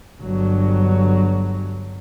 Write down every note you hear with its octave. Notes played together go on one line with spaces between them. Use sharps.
G1 F#3